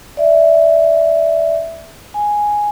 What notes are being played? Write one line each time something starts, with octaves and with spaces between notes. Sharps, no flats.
D5 E5
G#5